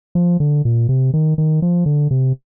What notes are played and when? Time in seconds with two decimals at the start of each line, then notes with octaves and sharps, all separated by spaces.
0.15 F3
0.40 D3
0.65 A#2
0.89 C3
1.14 D#3
1.38 D#3
1.62 F3
1.86 D3
2.11 C3